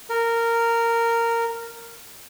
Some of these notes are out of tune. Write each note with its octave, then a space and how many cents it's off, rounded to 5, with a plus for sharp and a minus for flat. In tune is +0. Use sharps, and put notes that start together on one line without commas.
A#4 -10